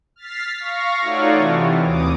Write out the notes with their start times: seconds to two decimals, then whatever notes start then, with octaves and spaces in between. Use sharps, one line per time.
0.16 F6 A6 B6 C7
0.59 F5 C#6 A#6
1.00 A3 D#4 F4 F#4 C#5 D5
1.30 C3 E3
1.81 D#2 D6 D#6